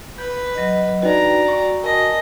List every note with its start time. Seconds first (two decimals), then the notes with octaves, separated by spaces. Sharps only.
0.18 B4 G6
0.55 F#3 D#5
1.02 D4 D#4 F#4 B4 D5 G5 A#5
1.48 C#6
1.83 A#4 D#5 G#5 A5